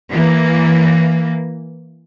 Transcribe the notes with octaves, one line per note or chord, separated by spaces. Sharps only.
E3 A#3